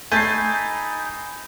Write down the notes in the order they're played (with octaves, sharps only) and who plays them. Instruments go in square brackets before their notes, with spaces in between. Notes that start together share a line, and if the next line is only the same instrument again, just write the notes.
[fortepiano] A3 [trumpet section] D#4 G5 B5 [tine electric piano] G#5 [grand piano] G6 A6 C7